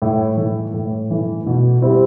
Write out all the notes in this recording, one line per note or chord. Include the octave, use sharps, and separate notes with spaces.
A2
E3 A3
A2
E3 A3
B2
G3 C4 E4 G4